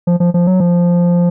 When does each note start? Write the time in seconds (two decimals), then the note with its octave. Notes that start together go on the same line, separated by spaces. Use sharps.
0.07 F3
0.20 F3
0.34 F3
0.47 F#3
0.60 F3